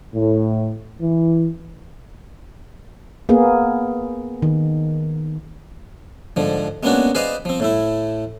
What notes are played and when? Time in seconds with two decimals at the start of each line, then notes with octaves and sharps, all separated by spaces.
0.14 A2
1.00 E3
3.29 A#3 B3 G#4
4.42 D#3
6.36 G#2 D3 F3
6.83 G#3 A#3 B3 C#4 D4 F#4
7.15 G#4 B4 C5 D5 D#5 F5
7.45 F3 C4
7.60 A2 A3 E4